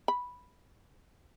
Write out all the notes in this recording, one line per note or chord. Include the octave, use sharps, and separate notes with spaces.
B5